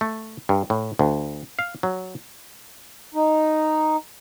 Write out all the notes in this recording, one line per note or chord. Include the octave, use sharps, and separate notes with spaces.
A3
G2
A2
D2
F5
F#3
D#4